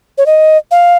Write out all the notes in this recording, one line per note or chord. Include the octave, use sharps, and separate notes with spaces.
C#5
D#5
F5